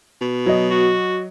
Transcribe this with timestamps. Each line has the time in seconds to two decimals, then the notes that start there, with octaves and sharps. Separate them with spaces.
0.21 B2
0.46 F#3 D#5
0.70 F#4